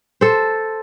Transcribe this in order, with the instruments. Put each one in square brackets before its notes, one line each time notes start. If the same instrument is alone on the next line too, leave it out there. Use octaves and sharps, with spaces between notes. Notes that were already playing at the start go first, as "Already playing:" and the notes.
[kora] A4 C5